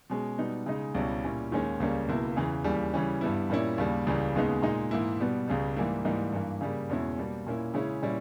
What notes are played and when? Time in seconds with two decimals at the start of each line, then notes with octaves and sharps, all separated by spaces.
0.10 B2 G#3 C#4
0.38 B2 G3 B3 D#4
0.66 C#3 G#3 D#4
0.94 C#2 B2 G3 C#4 E4
1.23 A#2 G3 C#4 E4
1.52 D#2 D#3 G#3 C#4
1.80 C#2 C#3 G3 A#3 C#4
2.08 C#2 B2 A#3 E4
2.36 E2 C#3 E3
2.64 D#2 C#3 E3 G3
2.94 C#3 E3 G3 C#4
3.21 G2 G3 B3 E4
3.50 A#2 G3 A#3 C#4 E4
3.78 D#2 C#3 G3 A#3
4.07 C#2 C#3 E3 G3
4.35 D#2 C#3 G#3 B3 D#4
4.63 A#2 G#3 D#4
4.91 G#2 E3 A#3 E4
5.20 B2 G3 B3
5.48 C#2 C#3 G3
5.76 G#2 E3 G3 A#3 E4
6.04 G#2 E3 G3 A#3 D#4
6.32 G2 E3 A#3
6.61 C#3 G3 A#3
6.89 E2 B2 G#3 C#4 E4
7.18 B2 G3 A#3
7.47 A#2 A#3 C#4 E4
7.74 C#3 G#3 C#4 E4
8.02 A#2 G3 C#4 E4